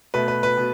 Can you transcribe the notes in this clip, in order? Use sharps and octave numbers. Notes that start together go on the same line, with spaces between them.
B2 A3 B4
B4
B4
B2